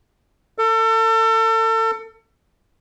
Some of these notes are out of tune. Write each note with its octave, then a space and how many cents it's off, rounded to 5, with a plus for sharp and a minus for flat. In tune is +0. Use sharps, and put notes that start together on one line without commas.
A4 +35